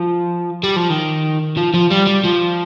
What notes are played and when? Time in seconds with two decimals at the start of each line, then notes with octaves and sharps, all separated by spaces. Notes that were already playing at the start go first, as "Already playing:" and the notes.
Already playing: F3
0.64 G3
0.76 F3
0.90 D#3
1.57 F3
1.74 F3
1.91 G3
2.07 G3
2.25 F3